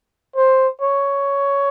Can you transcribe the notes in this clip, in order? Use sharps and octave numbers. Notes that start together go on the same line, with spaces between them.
C5
C#5